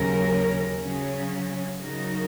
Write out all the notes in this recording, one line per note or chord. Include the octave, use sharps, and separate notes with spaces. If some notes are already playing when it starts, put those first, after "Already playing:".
Already playing: D#2 C#3 F#3 C#4 A#4
C#3 F#3 C#4
C#3 F#3 D#4 F#4 A#4